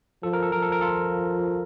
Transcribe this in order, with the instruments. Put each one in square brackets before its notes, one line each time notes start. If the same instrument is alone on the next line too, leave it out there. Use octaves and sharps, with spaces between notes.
[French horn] F3 [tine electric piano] A4
[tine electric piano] A#4
A4
[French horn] F3 [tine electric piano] A#4
[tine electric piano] A4
A#4
F4 A4